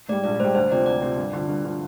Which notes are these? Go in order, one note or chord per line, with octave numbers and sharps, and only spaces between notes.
G#2 G3 D5
A#1 D5
G#2 G3 C5
D2 C5
C3 F3 C4 D5
D2 D5
C3 F3 C4
G2
D3 F3
G2
D3 F3